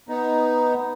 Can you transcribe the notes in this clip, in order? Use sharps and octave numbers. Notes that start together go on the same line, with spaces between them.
B3 D#4